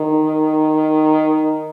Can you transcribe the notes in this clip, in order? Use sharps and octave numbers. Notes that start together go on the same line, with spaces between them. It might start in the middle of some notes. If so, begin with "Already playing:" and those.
Already playing: D#3